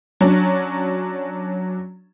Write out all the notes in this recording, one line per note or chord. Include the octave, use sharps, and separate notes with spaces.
F#3 C#4 D4